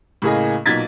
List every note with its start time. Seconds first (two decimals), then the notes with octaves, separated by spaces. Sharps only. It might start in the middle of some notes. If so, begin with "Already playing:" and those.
0.22 A2 C#3 A#3 G#4 D#5
0.66 B1 A#2 D#4 G#6 A6 B6